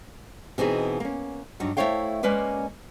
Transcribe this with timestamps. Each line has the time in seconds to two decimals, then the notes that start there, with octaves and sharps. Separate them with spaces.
0.58 B2 E3 C4 D#4 G#4
1.00 A#3 C#4
1.60 G2 F#3 D#4
1.77 A3 E4 C5 C#5 F5 G5
2.23 G#3 A#3 C#4 B4 D5